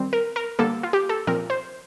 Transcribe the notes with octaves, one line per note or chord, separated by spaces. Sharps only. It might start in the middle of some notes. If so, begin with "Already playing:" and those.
Already playing: D#3 G3 C4
A#4
A#4
D3 G3 A#3 A4
F4
G4
A4
A#2 F3 C4 A#4
C5